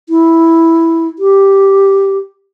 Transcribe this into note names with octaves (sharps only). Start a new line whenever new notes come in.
E4
G4